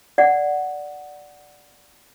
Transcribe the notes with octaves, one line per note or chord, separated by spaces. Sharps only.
D5 F#5